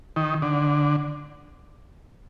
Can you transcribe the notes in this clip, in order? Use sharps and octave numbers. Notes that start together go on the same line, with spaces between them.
D#3
D3